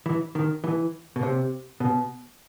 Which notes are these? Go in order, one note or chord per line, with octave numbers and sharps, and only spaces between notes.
E3
D#3
E3
B2
C3
B2